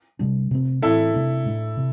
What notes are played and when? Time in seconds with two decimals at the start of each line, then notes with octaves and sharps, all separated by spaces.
0.19 C3 G3 D4
0.51 C3 A3 C4
0.82 A2 E3 A3 C4 E4 A4
1.14 C3 A3 D4
1.45 A2 A3 D4
1.77 C3